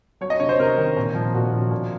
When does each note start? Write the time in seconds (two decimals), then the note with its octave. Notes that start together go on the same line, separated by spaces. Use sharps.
0.21 F#3 C#5
0.30 D#5
0.40 C3 C#5
0.49 C5
0.59 C3 A#4
0.78 D#3
0.96 A#2
1.15 F3
1.34 A#2 F#4
1.53 F3
1.71 A#2